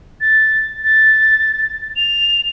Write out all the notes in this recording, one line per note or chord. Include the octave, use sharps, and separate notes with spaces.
A6
A6
F7